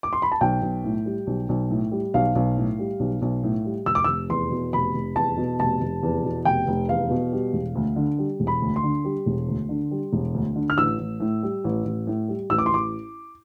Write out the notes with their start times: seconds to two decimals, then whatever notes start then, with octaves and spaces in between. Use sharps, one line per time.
0.03 D6
0.13 C6
0.22 B5
0.32 A5
0.41 B1 G5
0.62 B1
0.84 A2
1.06 G3
1.27 B1
1.49 B1
1.70 A2
1.92 G3
2.14 B1 F5
2.35 B1
2.57 A2
2.79 G3
3.00 B1
3.22 B1
3.43 A2
3.65 G3
3.86 F1 E6
3.95 D6
4.04 F1 E6
4.29 E2 C6
4.51 B2
4.73 F1 B5
4.94 F1
5.16 E2 A5
5.37 B2
5.59 F1 A5
5.81 F1
6.03 E2
6.24 B2
6.45 F1 G5
6.68 F1
6.89 E2 F5
7.10 B2
7.32 G3
7.53 E1
7.75 D2
7.96 D3
8.18 G3
8.40 E1
8.47 B5
8.62 D2
8.76 C6
8.83 D3
9.05 G3
9.26 E1
9.48 D2
9.69 D3
9.91 G3
10.13 E1
10.34 D2
10.56 D3
10.70 F6
10.78 A1 E6
10.99 A1
11.20 A2
11.43 G3
11.64 A1
11.85 A1
12.07 A2
12.28 G3
12.50 A1 E6
12.58 D6
12.66 C6
12.72 A1 D6